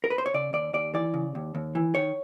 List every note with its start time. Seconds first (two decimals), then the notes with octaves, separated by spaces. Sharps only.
0.04 A#4
0.10 B4
0.18 C5
0.26 C#5
0.34 C#3 D5
0.53 D#2 D5
0.73 D#2 D5
0.94 E3 D5
1.14 C#3
1.35 D#2
1.55 D#2
1.75 E3
1.95 D#3 C#5